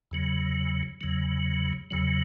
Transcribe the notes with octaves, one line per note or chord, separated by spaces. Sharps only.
E2 C#3 F#3
E2 C#3 F#3
E2 C#3 F#3